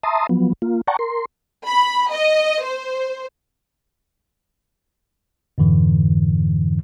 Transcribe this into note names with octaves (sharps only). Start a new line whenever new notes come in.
E5 A5 A#5 C6 D#6
F3 F#3 B3
A#3 F4
D5 F#5 G5 A5 A#5 C#6
A#4 C6
B5
D#5
C5
F2 G#2 D3 E3